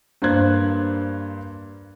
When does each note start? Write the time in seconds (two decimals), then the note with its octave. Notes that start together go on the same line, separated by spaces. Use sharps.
0.22 G2 A#3 C5 F#6 G#6